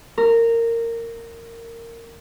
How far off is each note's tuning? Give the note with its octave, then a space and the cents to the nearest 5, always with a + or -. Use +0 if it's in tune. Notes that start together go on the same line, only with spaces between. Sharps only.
A#4 -15